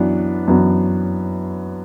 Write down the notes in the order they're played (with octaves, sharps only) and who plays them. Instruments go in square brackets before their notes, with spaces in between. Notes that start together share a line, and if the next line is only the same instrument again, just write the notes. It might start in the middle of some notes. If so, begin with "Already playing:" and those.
Already playing: [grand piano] F#2 E3 B3 D4 F#4
F#2 E3 B3 D4 F#4